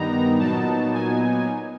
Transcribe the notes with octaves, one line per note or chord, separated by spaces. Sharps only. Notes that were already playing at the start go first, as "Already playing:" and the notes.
Already playing: G2 D#3 G3 B3 D#4 A#5
A#2 F#3 B3 D#4 A5
G#5